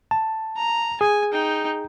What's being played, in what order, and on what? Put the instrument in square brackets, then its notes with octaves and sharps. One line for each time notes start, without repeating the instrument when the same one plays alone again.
[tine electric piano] A5
[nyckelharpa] A#5
[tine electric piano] G#4 [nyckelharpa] G#5
[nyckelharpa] D#4 G5